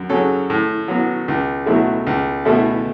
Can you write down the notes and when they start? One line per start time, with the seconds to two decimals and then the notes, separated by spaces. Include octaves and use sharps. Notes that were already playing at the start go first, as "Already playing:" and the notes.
Already playing: F#2
0.09 C#3 F#3 C#4 A4
0.50 A2
0.88 F#3 B3 F#4
1.28 C#2
1.66 B2 F#3 A3 E4
2.07 C#2
2.45 B2 A3 E4 A4